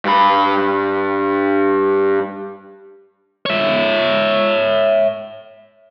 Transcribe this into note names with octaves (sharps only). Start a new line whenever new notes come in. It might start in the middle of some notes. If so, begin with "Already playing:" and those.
G2 B5
C#5 E5